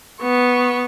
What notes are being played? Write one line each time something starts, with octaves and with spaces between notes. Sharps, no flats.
B3 C#6